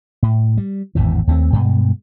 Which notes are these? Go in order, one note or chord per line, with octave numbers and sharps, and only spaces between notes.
A2
G3
G#1 E2 A2 E3
D#2 A3 A#3 C4
G2 B2 G#3